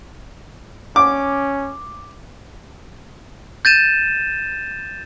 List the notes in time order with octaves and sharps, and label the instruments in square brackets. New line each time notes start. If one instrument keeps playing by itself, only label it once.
[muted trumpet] C#4 [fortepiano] D6
[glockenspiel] G6 A6 D#7 E7